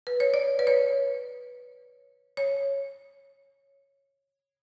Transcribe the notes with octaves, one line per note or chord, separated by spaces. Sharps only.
B4
C#5
D5
B4
C#5
C#5